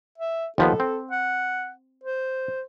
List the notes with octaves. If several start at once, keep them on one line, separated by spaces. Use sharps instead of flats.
E5
D#2 F3 B3 A4
C4
F#5
C5